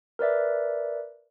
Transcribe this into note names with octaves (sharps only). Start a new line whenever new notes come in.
A#4 B4 D5 E5